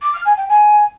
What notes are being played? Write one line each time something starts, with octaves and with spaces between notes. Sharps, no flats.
D6
F6
G#5
G5
G#5